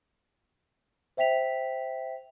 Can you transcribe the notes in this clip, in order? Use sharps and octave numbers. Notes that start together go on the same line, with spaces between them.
C5 E5 G5 B6 F7